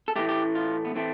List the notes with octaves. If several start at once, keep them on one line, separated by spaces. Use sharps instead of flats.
A4
A2 E3 A3 G4
G4
F4
B3
A2 E3 A3 C4